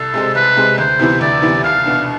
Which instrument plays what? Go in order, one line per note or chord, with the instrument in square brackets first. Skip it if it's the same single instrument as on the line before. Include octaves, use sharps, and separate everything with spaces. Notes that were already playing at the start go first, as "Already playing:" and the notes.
Already playing: [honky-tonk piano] C2 [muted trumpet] A4
[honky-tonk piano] C3 G#3 C4
[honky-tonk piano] C2 [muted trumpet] B4
[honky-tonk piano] C3 G#3 C4
[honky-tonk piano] D2 [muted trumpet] C5
[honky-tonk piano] C3 E3 B3 E4
[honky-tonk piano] D2 [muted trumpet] D5
[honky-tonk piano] C3 E3 B3 E4
[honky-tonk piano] C2 [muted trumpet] F5
[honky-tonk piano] B2 B3 D4